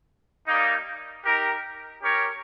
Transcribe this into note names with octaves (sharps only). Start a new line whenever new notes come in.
G3 A#3 D#4
D#4 G4 A#4
C#4 G4 A#4 C#5